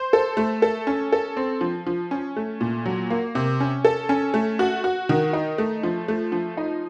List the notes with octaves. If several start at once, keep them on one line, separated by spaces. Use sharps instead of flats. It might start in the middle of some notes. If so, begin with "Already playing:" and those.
Already playing: C5
A4
A3
A4
C#4
A4
C4
F3
F3
C#4
A3
A#2
F#3
A#3
C3
C#4
A4
C#4
A3
F#4
F#4
D#3
D#4
A3
F3
A3
F3
D#4